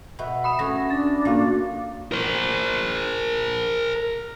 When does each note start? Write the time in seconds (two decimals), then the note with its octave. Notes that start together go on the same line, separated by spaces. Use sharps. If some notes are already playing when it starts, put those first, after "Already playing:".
0.19 B2 B3 E5
0.44 B5 D#6 E7
0.59 A3 C#4 F#4 A#6
0.90 D4 A6
1.25 A#2 A3 A#3 F#4 F5
2.12 A#4 C5